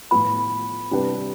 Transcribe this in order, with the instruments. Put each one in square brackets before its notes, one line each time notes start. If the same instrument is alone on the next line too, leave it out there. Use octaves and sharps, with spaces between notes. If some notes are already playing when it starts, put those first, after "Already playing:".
[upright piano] A2 F3 B3 F4 [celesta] B5
[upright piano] C3 G3 D4 G4 B4